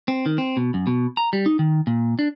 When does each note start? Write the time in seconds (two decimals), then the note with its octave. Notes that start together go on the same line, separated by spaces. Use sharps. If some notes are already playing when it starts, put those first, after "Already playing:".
0.08 C4
0.26 D#3
0.38 C4
0.57 B2
0.74 F#2
0.87 B2
1.17 A#5
1.33 G3
1.46 D#4
1.59 D#3
1.87 A#2
2.19 D4